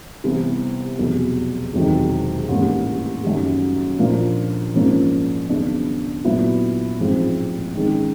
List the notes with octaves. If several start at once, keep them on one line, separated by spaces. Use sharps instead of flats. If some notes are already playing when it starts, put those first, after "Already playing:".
C2 C3 E3 G3 B3
F1 E2 B2 F#3
E1 E2 C3 D#3 F#3
A1 G#2 E3 G3 A#3
F#1 F#2 D#3 G3
A#2 F3 A#3 D4 F4
G#2 F3 A#3 C#4
D#2 C#3 F#3 B3 D4
A#2 F#3 B3 E4
A1 G#2 F3 G#3 C4
G#2 D#3 G#3 C#4